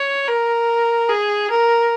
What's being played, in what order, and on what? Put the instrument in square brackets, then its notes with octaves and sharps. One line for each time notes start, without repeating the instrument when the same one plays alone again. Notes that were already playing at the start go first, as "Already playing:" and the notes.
Already playing: [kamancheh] C#5
A#4
G#4
A#4